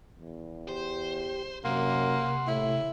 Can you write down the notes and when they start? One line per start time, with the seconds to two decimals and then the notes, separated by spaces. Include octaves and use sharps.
0.15 E2
0.69 G4 C5
1.65 F#2 C3 A#3 F#5 C6
2.47 A2 E4